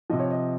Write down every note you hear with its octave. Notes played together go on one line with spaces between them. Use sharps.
C3 F3 D#5
C#5
D#5